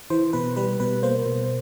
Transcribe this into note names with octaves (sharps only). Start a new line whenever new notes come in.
E3 C5
B2 B4
G3 B4
B2 B4
A#3 C5
B2